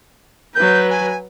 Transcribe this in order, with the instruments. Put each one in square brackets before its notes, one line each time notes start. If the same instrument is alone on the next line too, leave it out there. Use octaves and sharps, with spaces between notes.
[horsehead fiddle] F#3 B4 [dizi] G6
[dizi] G#5